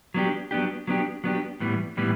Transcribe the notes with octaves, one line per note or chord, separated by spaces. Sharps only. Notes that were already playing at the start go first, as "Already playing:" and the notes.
F#3 B3 D4 G4
F#3 B3 D4 G4
F#3 B3 D4 G4
F#3 B3 D4 G4
A2 E3 G3 B3
A2 E3 G3 B3